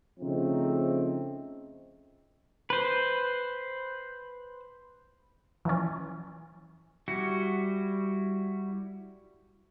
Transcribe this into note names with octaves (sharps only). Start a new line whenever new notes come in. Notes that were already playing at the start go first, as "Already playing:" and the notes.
C#3 F3 A3 C4 D#4
B4 C5
E3 F3 C#4
G3 E4 F#4